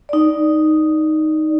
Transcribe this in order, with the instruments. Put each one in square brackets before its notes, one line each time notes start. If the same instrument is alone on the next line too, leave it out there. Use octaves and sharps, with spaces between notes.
[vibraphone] D#4 D5